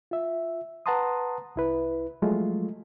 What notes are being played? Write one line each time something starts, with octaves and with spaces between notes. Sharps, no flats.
F4 E5
B4 F#5 A5 A#5 C6 D#6
C2 E4 B4
F3 F#3 G#3 A3 F4